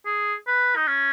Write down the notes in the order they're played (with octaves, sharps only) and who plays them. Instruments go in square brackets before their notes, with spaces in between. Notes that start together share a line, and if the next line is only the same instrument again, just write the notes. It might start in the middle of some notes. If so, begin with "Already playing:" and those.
[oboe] G#4
B4
D#4
C#4